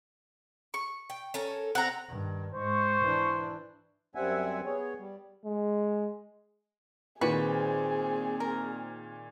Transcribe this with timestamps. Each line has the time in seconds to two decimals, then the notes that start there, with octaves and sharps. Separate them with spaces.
0.74 C#6
1.10 G5
1.34 C#4 A4 A#4
1.75 C4 F#5 A#5
2.08 G2 D#3
2.54 G#2 G#3 C5 C#6
3.01 E3 D4
4.15 F#2 G3 C4 E5 F#5 G#5
4.66 B3 G#4 C#5
4.98 G3
5.45 G#3
7.21 A#2 D#3 C4 F#4 G#4 B4
8.40 A#4